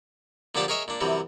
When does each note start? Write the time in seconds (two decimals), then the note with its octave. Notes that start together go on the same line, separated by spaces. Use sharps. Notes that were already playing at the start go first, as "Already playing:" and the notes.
0.55 A#2 D3 F3 D4 G4 A5
0.68 G#4 A#4 C#5 D#5 E5
0.88 A#2 D4
1.01 F#2 C3 E3 G3